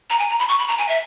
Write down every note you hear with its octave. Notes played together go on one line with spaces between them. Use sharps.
A#5
G#5
A#5
B5
C#6
B5
A#5
G#5
E5